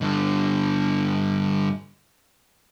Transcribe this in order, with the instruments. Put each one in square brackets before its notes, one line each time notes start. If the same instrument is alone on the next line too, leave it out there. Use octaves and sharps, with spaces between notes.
[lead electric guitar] G2 D3